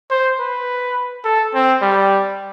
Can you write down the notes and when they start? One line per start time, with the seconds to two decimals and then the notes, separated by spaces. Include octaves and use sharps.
0.11 C5
0.39 B4
1.24 A4
1.54 C4
1.82 G3